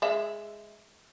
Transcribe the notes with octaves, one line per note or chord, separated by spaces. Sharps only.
G#3 E5